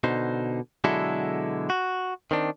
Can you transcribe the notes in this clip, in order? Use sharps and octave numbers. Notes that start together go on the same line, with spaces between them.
B2 D3 D#4 C5
B2 D3 F#3 G#3 E4 A4
F#4
D#3 C4 D4